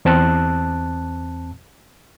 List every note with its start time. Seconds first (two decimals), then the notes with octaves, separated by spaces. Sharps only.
0.05 E2 C4 A5 F#6